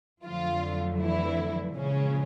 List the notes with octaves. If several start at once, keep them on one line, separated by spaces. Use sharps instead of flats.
F2 D3 F3 F#3 A3 F4
E3 E4
A#2 C#3 F3 G#3 C#4